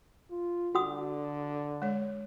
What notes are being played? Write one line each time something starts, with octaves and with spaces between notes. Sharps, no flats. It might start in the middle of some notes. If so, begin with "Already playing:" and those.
F4
D3 F#4 F#5 D#6
G#3 C#5